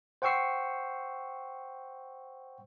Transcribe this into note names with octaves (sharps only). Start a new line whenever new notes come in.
C5 F#5 G5 C#6 E6 C7